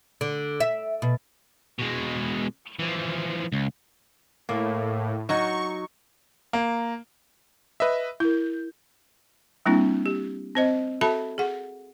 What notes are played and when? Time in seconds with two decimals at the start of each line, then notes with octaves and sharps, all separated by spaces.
0.21 D3
0.60 E5
1.02 B2
1.79 B2 G#3
2.79 E3 F3
3.52 C#2
4.49 A2 A#3
5.29 F#3 D#4 F#4 C#6
6.53 A#3
7.80 B4 D#5 E5
8.20 E4 A#4 G6
9.66 G3 A#3 C4 D4 E4
10.06 G4
10.55 C4 C5 D#5
11.01 F#4 A4 E5 A5 B5
11.38 G#4 F#5